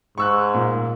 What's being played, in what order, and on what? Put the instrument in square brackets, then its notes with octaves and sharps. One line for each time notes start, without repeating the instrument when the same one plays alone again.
[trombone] G#2 [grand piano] C#6 E6 F#6
[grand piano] A#2